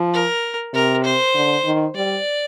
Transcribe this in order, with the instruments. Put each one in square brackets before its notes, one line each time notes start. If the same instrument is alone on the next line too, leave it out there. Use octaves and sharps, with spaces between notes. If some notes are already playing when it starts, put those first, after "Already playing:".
Already playing: [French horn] F3
[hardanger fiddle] A#4
[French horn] C3 [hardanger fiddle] A#4
[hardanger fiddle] C5
[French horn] D3
D#3
[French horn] G3 [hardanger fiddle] D5